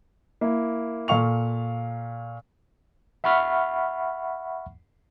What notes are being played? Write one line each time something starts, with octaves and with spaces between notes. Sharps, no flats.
A#3 E4
A#2 A4 F5 C#6 F7
E5 F#5 B5 C#6 F6